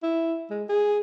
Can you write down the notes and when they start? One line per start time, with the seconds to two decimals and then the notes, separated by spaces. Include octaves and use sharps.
0.03 E4
0.50 G#3
0.69 G#4